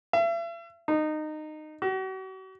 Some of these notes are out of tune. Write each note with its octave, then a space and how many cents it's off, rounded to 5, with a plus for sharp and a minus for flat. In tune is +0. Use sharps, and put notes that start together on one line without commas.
E5 +40
D#4 -20
F#4 +40